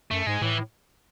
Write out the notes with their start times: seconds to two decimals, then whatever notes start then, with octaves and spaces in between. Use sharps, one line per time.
0.11 F#2 A3
0.27 G#2 G#3
0.42 A2 E3